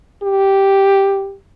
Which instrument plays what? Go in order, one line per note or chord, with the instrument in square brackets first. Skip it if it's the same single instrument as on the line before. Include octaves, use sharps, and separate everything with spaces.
[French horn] G4